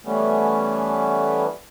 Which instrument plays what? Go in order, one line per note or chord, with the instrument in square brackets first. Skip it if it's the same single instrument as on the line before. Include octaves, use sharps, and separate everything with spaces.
[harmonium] E3 G3 A3 B3 C#4